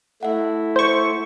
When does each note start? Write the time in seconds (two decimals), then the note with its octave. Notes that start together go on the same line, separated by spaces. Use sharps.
0.23 A3 E4 E5 F#5
0.76 C5 C#6